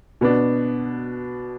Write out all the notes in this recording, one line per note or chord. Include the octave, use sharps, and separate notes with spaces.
B2 B3 D4